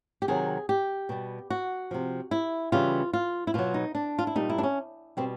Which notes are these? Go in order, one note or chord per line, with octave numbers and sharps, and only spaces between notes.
G4
C3 D#3 F#3 G#4
G4
B2 G3
F#4
C3 F3
E4
C#3 E3 G3 F4
F4
E4
B2 F#3 F4
D#4
D4
F4
E4
A#2 G3 D#4
E4
D4
C#4
B2 G3 C4